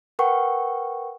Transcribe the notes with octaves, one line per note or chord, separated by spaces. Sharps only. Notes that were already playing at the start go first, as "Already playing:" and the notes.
A#4 B4 F#5 G5 C#6